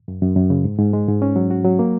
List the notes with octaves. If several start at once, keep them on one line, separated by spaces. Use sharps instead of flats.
F#2
F#2
F#2
C#3
G#2
G#2
G#3
G#2
C#4
F#3
F#4
F#3
A#3